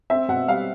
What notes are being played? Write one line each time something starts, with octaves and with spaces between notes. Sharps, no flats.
C4 E5
B2 F#5
G3 F5